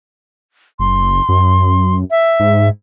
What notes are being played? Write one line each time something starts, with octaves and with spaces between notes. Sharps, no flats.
F#1 C6
F#2
E5
G#2